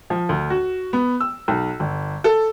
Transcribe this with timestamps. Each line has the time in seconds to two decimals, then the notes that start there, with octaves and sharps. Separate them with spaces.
0.10 F3
0.29 D2
0.50 F#4
0.93 B3
1.20 E6
1.48 B1
1.80 G1
2.24 A4